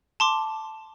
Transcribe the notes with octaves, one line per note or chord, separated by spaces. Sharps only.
A5 C6 D6